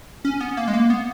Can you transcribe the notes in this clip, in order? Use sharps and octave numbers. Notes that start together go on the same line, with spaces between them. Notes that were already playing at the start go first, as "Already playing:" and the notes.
C#4
B3
A#3
G#3
A#3
B3